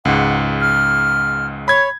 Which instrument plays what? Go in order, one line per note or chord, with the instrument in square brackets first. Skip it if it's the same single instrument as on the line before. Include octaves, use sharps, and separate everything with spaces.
[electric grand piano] C#2 G#2 [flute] F#5
[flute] F6
[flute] C#5 [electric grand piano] B5 G#6